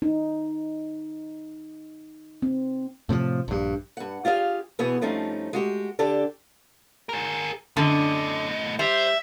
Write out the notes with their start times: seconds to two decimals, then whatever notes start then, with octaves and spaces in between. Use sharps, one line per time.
0.02 D#4
2.42 C4
3.09 A2 C3 D#3 F3
3.48 A#1 G2
3.97 G2 F#5
4.25 F4 G4 G#4 E5 F5
4.79 B2 E3 B3 G#4
5.02 G2 F3 A3 C4 C#4 D#4
5.53 G#3 F#4 G4
5.99 D3 D4 G4 A4
7.09 G#4 A#4
7.77 F#2 A2 D3 D#5
8.79 G3 C5 E5